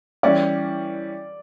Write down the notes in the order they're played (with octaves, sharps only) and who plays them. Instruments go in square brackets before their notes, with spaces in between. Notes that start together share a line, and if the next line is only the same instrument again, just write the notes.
[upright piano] E3 G3 C#4 [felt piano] D5